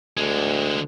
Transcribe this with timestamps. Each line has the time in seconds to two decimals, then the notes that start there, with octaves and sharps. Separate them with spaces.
0.17 D2 D3 G#3